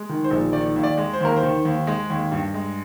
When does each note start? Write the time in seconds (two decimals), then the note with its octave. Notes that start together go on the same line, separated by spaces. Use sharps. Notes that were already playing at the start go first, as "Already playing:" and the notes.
Already playing: G#3
0.09 D#3
0.24 C5
0.31 A#1
0.53 D#3 D5
0.76 D#2
0.83 D5
0.98 G#3
1.13 C5
1.21 D#2 A#4
1.36 C5
1.43 D#3
1.65 D#2
1.87 G#3
2.10 D#2
2.32 G2
2.54 G#3